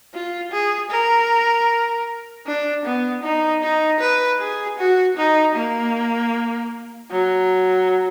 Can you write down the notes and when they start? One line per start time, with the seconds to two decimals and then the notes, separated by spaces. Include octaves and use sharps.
0.14 F4
0.52 G#4
0.90 A#4
2.47 D4
2.85 B3
3.23 D#4
3.63 D#4
4.00 B4
4.39 G#4
4.79 F#4
5.17 D#4
5.55 A#3
7.11 F#3